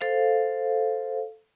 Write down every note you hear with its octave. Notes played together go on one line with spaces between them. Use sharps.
A4 C5 F5